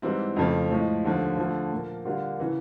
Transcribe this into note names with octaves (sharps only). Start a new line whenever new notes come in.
G#2 E3 G3 C4 E4
F2 C#3 F3 A3
A2 F3 G#3
D#2 D3 F3 A3
D3 F3 A3
A#2 F3 A#3
D3 G3 A#3 D4 F4
C#3 E3